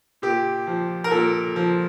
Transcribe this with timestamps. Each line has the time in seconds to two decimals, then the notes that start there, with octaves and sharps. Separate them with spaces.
0.22 A#2 G4
0.67 F3
1.04 A#4
1.11 A#2 A4
1.56 F3